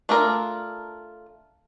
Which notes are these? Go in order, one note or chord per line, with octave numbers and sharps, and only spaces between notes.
A3 D4 F4 A#4